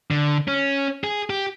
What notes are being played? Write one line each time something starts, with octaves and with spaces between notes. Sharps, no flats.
D3
C#4
G#4
G4